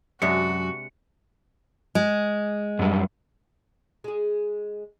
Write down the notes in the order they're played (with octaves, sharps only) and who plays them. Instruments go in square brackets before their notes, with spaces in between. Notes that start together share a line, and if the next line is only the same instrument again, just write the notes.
[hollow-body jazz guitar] F#2 [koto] C3 G#3 D4 [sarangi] F#4 [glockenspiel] C#7
[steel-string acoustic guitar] G#3
[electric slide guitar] F#2 G3
[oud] G#3 G#4